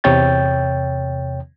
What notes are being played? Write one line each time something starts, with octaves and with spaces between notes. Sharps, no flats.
E2 C3 C#5 G5 G6 A6